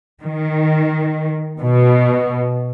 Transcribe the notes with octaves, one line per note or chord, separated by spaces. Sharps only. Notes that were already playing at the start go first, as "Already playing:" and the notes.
D#3
B2